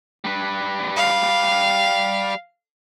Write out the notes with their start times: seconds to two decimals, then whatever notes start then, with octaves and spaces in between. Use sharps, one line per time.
0.24 G3 B4
0.96 F5